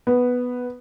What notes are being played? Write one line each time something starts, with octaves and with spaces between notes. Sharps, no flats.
B3